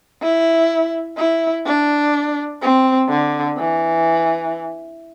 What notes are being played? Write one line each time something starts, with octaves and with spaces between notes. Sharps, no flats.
E4
E4
D4
C4
D3
E3